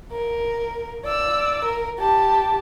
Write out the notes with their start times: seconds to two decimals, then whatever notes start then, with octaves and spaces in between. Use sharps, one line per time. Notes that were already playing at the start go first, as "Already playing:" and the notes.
0.12 A#4
1.05 D5 E6
1.64 A#4
1.99 G4 A5